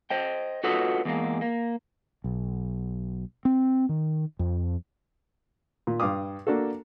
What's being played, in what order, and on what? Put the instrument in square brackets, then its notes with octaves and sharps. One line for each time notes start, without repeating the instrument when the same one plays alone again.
[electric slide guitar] C5 D#5 G5
F4 F#4 A4 B4 C#5 D#5
E2 G#3 A#3
A#3
[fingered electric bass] B1
C4
D#3
F2
[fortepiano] A#2
G2 F5 D6 D#6
A#3 D4 F#4 A4